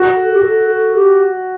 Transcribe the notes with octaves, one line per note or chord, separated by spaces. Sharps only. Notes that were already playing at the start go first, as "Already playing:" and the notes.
Already playing: F#4
A4
G4
A4
A4
G4